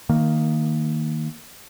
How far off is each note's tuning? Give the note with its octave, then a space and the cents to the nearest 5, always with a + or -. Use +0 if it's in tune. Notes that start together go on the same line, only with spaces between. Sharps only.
D#3 +0 A#3 -15